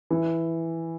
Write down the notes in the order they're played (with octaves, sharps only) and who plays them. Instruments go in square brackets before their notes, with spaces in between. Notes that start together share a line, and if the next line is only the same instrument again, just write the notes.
[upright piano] E3